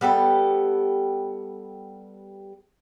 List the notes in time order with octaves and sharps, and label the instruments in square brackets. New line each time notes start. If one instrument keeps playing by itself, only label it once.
[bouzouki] G3 B3 G4 A4